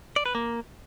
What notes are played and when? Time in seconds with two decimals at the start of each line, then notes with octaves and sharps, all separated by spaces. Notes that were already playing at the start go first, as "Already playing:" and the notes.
0.16 D5
0.26 B4
0.35 A#3